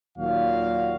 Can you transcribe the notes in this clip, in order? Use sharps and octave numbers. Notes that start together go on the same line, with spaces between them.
D#2 A#2 F#3 F#4 F5